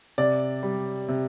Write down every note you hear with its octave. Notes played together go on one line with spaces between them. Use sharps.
C3 D5
G3
C3